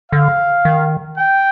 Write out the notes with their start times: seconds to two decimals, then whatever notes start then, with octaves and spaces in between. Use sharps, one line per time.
0.12 D3 F5
0.65 D#3
1.18 G5